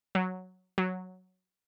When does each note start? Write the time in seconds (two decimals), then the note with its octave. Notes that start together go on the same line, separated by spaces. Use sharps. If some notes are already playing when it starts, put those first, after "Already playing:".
0.15 F#3
0.78 F#3